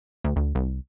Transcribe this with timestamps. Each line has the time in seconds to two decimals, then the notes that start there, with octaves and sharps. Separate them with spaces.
0.24 D2
0.36 D2
0.55 C2